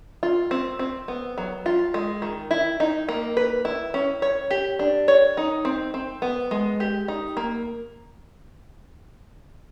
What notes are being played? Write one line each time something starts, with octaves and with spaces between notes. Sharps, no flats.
F4
C4
C4
B3
F#3
F4
G#3
D#3
E4
D#4
A#3
B4
E4
C#4
C#5
G4
D4
C#5
D#4
C4
C4
B3
G#3
G4
D#4
A#3